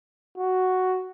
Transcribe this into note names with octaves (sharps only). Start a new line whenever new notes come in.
F#4